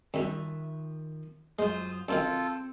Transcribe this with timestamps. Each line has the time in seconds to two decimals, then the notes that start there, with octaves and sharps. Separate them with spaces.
0.14 C2 F#2 D#3 F3 E5
1.59 F#2 G#3 F4 C5 D#6
2.09 F#2 C3 D#3 C4 F4 A4